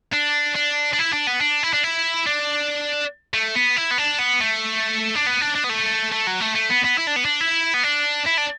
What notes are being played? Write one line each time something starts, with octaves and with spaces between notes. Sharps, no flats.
D4
D4
D4
E4
D4
B3
D4
E4
D4
E4
D4
A3
B3
E4
B3
D4
B3
A3
D4
B3
D4
D4
B3
A3
A3
F#3
A3
A3
B3
B3
E4
D4
B3
D4
E4
B3
D4
E4
D4